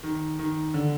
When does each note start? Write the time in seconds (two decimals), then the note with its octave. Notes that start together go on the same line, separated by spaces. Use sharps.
0.03 D#3
0.39 D#3
0.74 D3